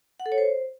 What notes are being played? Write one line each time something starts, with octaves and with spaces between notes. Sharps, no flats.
F#5
A4
C#5
C5